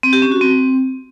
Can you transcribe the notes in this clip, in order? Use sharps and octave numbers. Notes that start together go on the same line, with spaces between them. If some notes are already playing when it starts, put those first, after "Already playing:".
C4
G4
C#4
F#4
C4